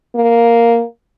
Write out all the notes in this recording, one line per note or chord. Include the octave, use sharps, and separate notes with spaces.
A#3